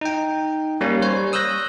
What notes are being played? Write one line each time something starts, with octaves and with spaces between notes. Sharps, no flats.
D#4 G5
G3 A#3 C#4
G3 C5 C#5
C#5 D#6 E6 F#6 G6 A#6